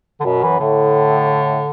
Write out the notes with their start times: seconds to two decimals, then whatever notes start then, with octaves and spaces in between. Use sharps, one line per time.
0.20 D3
0.25 F#2 B2
0.43 E3
0.60 A2 D3